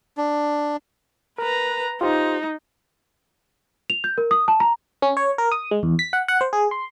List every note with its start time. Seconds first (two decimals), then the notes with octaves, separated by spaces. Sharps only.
0.18 D4
1.38 A#4 B4 A#5
2.01 D#4 F4 G4 C5
3.90 F7
4.04 G6
4.18 A#4
4.31 D#6
4.48 A5
4.60 A#5
5.02 C#4
5.17 C#5
5.38 A#4
5.52 D#6
5.71 G#3
5.83 E2
5.99 B6
6.13 F#5
6.28 F#5
6.41 C5
6.53 G#4
6.71 C6